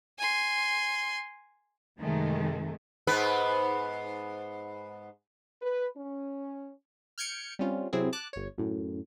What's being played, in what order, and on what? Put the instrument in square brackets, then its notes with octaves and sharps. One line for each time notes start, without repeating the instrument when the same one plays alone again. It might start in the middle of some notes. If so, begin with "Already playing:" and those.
[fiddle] G#5 C6
[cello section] F#2 C3 D#3 G#3 A3
[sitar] G#2 B3 B4
[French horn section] B4
C#4
[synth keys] F6 G6 G#6 C#7 D7
G3 C4 C#4 F4
C3 F#3 C4 E4 G#4
A5 D6 F#6
G1 C#5
F#2 A2